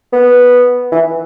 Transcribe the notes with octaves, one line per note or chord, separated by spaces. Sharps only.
B3
E3